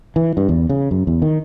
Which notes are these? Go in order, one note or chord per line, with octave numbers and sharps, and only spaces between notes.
E3
G2
E2
C#3
F#2
E2
D#3